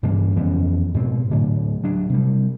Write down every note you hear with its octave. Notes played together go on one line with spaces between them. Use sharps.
G2 C#3 E3 A#3
F2 E3 B3 C#4
G#2 B2 C4
A2 D3 F#3
F#3 D4
C3 G3